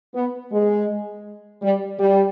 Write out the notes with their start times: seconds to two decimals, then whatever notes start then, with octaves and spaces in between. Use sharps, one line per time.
0.15 B3
0.52 G#3
1.62 G3
1.99 G3